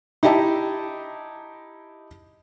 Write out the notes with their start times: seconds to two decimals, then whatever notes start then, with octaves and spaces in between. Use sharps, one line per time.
0.23 D#4 E4 G4 D#5 A5